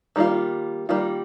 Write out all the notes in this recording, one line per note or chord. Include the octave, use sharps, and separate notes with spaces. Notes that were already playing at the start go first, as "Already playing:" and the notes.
D#3 G3 A#3 F4
D#3 G3 A#3 F4